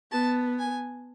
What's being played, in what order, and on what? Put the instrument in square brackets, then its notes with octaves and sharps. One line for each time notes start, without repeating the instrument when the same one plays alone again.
[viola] B3 [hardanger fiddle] A5
[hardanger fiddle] G#5